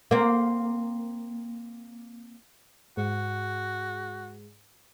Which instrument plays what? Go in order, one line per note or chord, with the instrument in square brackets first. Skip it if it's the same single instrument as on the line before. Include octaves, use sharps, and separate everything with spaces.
[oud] A#3 C4
[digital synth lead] G#2 [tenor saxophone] F#4